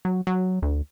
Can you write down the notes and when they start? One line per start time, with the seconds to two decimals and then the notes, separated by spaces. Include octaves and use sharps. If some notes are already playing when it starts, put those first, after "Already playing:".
0.05 F#3
0.27 F#3
0.62 D2